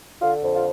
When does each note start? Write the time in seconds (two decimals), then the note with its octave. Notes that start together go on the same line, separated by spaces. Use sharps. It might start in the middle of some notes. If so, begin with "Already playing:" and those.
0.22 D3 F4
0.44 F2
0.54 F4